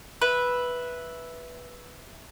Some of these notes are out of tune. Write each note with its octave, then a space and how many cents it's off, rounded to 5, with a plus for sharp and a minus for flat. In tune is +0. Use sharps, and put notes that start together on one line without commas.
B4 -5 E5 +0